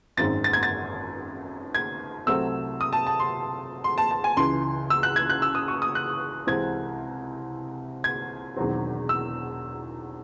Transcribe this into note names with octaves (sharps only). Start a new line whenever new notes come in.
G#1 F#2 D#3 G#3 C4 A6
A6
G#6
A6
G#6
C2 C3 F#3 A3 C4 E6
D#6
A5
A5
C6
C6
A5
A5
G#5
C#2 C#3 E3 C6
E6
F#6
G#6
F#6
E6
D#6
C#6
D#6
F#6
C2 C3 E3 G#3 C4 G#6
G#6
E1 E2 D#3 F#3 C4
E6